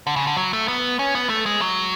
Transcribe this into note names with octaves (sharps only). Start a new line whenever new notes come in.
D3
C#3
D3
F#3
A3
B3
C#4
B3
A3
G#3
F#3